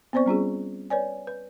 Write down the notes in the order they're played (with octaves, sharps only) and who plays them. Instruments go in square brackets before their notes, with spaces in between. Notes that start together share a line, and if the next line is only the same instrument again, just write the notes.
[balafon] B3 C4 C5 D5 C#6
G3 C#4 F4 G#4
B4 C#5 D5 G#5
B4